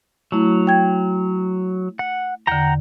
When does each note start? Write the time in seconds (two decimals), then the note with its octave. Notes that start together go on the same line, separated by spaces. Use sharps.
0.32 F#3 A3 E4
0.67 G5 G#6
1.99 F#5
2.47 E2 D3 F#5 G5 A#5